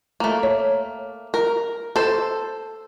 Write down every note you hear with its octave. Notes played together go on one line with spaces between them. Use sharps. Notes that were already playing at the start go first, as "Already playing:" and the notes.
A3 A#3
C#5
A#4
A4 C5